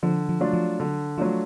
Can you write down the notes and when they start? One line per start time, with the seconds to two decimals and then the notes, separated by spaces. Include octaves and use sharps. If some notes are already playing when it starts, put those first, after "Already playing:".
0.03 D3 F3
0.29 F3
0.41 F#3 A3 D4 F4
0.53 F3
0.80 D3 F#3
1.17 F3 F#3 A3 D4 F4